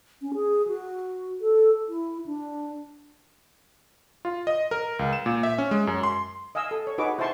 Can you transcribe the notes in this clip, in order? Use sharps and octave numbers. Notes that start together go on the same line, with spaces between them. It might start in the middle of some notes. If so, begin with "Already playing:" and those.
C#4
G#4
F#4
A4
E4
D4
F4
D#5
A#4
C#2
E7
A#2
E5
C#4
G#3
F#2
C6
D#5 F5 G#5 E6
A4
C#5
D#4 F#4 G#4 B4 C#5 D6
E4 C5 E5 A5 C6 C#6